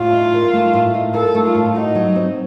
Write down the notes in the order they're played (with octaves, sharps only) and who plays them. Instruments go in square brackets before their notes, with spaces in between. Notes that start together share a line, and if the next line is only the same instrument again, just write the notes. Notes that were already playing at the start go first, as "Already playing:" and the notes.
Already playing: [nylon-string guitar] A2 [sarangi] F4
[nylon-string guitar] D#4
A#4
A3
A2
D#4
[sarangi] A4 [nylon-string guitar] A#4
[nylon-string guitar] A3
[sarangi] F4
[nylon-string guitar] A2
[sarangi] D#4 [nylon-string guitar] F#4
[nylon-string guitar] F#3
C4